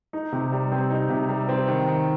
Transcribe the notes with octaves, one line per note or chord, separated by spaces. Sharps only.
D#4
C3
G3
C4
D#4
C3
G3
C4
D#3
D#3